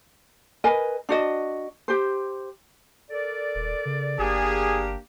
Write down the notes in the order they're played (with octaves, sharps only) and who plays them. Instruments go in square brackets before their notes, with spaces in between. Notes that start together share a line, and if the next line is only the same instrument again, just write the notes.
[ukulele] A#4 B4 D#5 G#5
D4 F#4 D#5
G4 C5
[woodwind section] A4 A#4 D5
[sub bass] D#1
C#3
[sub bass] G1 [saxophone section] A#3 D4 G4 [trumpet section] G#4